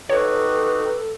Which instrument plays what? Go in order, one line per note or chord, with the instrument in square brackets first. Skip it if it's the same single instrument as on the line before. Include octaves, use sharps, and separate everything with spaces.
[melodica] D#4 F#4 G4 [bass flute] A4 [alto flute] B4 [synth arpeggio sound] C#5